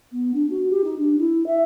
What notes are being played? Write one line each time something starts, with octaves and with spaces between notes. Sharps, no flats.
B3
D4
F#4
G4
D#4
D4
E4
E5